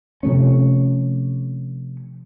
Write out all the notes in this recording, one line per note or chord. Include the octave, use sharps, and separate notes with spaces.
C3 F3 A3 C#4